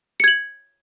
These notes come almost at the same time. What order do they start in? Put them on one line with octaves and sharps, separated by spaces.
C#7 G#6 F#7